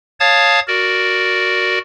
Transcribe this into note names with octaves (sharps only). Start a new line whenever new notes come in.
C#5 F5 A5 D#6 G#6 A6
F#4 A#4 D5